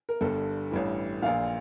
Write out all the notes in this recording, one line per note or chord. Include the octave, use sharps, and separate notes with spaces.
A#4
G1 G2 D3 A4
A1 G2 E3
A#1 A#2 F5